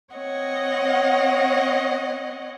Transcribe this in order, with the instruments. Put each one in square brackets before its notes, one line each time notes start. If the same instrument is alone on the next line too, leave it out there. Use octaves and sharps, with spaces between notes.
[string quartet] C4 C#5 D#5 F#5